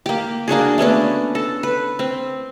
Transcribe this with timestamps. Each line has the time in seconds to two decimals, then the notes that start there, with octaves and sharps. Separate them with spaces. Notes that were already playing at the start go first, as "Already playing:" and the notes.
0.06 A#3 G4
0.48 A#3 D4 F#4 G#4
0.78 A3 B3 C#4 D4
1.35 A4
1.63 B4
1.99 C4